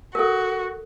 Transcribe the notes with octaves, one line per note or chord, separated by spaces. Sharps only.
F#4 A4 A#4